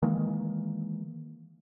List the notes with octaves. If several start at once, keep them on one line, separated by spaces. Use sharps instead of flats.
D#3 E3 G#3 A#3